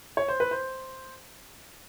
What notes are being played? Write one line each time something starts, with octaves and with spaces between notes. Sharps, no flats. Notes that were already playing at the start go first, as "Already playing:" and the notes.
C#5
C5
B4
C5